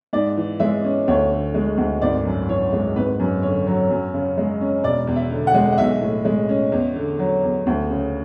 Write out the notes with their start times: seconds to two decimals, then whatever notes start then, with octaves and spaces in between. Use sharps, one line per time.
0.13 G#2 D5
0.37 E3
0.60 G#3 E5
0.84 C#4
1.08 D2 C#5
1.31 D3
1.54 G#3
1.77 D2
2.02 G#1 D5
2.25 F#2
2.49 E3 C#5
2.72 G#3
2.96 G#1 B4
3.20 F#2
3.42 D3 C#5
3.67 F#3
3.91 F#2
4.14 C#3
4.38 G#3
4.61 C#4
4.84 E1 D5
5.07 E2
5.16 E5
5.31 D3
5.47 F#5
5.54 G#3
5.72 F#5
5.78 B1 E5
6.02 A2
6.25 G#3
6.49 C#4
6.72 E2
6.96 D3
7.19 F#3
7.43 E2
7.67 D2
7.90 C#3